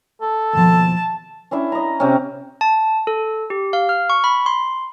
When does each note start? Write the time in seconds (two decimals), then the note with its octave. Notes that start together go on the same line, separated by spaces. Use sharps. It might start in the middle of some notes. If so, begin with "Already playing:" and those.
0.21 A4
0.53 D#2 B2 F3 A5
1.51 C#4 D4 E4 E5
1.72 D#5 A#5
2.00 C3 C#4
2.61 A5
3.07 A4
3.50 G4
3.73 F5
3.89 F6
4.10 C#6
4.24 B5
4.46 C6